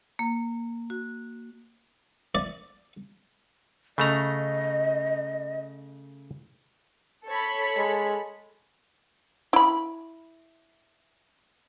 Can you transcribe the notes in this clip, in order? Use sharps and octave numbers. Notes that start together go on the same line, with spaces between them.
A#3
F#4
D5
C#3 A3 D#5 A#5
A4 C#5 B5
G#3
E4 B5